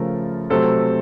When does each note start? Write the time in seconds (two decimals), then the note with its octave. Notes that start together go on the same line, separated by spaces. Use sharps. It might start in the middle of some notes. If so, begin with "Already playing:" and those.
Already playing: C#3 F3 A3 A#4
0.50 C3 F#3 A3 C4 A4 C5